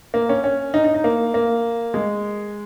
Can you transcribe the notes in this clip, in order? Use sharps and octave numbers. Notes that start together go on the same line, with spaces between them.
A#3
C#4
C#4
D#4
D#4
D#4
A#3
A#3
G#3